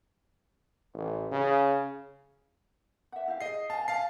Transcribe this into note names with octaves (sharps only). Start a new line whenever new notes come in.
A1
C#3
E5 F#5
E4 G4 F5
G#4 D#5 C7
F5 G#5 A5
F5 G#5 A5 C7